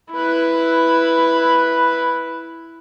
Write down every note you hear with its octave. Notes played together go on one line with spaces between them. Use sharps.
E4 B4